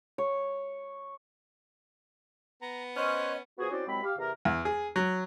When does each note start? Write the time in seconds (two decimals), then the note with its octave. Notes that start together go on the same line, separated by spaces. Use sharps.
0.18 C#5
2.62 B3 A#5
2.97 C#4 C5 C#5 D#5 F#6
3.59 F3 B3 F#4 G#4
3.71 C4 C#4 E4 F#4 C5 D5
3.87 C2 F#3 G#3 C4 B5
4.03 G4 F5
4.18 E2 C3 A#4
4.45 E2
4.65 G#4
4.96 F#3